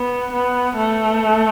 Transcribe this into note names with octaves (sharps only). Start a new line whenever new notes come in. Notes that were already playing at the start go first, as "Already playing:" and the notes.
Already playing: B3
B3
A3